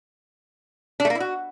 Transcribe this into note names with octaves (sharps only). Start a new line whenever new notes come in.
D4
A3
A#3
E4
F#4